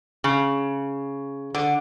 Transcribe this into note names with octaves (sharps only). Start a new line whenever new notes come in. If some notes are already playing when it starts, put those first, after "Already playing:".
C#3
D3